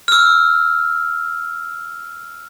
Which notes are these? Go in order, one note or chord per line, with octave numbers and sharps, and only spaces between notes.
E6 F6